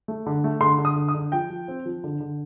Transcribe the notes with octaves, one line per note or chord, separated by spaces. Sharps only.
A3
D3
A3
D3 C6
D3
D#6
D3
D#6
D3
F3 G5
F3
C4
F3
D3
D3